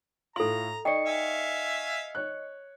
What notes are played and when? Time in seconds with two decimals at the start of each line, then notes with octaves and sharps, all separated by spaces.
0.36 A2 F4 A4 A#5 C6
0.85 D#4 D5 D#5 G5 C#6 C7 C#7
1.06 E5 F5 G#5
2.15 C#5 F#6